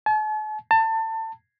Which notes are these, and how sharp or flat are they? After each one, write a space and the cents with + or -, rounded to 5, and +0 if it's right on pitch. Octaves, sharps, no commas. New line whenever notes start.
A5 -45
A5 +25